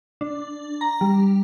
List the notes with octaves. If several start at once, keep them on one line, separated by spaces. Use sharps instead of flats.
D4
A#5
G3